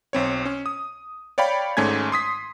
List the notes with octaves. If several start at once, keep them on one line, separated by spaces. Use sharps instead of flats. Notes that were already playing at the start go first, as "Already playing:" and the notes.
B1 C4 C#5
C#4
D#6
C#5 D5 F5 G5 B5
G#1 G#2 A3 C#4 G#5 G#6
C6 D#6 B6